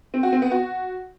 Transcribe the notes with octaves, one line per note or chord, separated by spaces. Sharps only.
C4
F#4
C4
B3
F#4